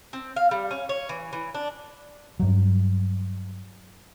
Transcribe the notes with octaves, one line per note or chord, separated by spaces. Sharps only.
C4
F5
G3
C#4
C#5
E3
E3
D4
G2 F#3